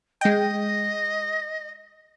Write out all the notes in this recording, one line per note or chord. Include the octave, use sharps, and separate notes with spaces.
G#3 D#5 G5